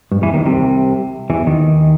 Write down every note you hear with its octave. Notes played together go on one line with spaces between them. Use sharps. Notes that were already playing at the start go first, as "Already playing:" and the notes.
G2
E2 E3
D#2 D#3
C2 C3
E2 E3
D#2 D#3